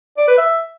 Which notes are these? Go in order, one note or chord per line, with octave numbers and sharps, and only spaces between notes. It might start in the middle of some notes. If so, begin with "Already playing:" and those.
D5
B4
E5